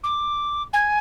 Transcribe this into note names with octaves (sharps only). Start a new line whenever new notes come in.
D6
G#5